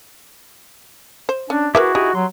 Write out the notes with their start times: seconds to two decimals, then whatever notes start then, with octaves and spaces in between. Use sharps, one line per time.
1.29 C5
1.50 C#4 D4
1.75 E4 F#4 G#4 A#4 B4 E5 D6
1.95 D#4 E4 G4 G#4
2.15 F#3 C6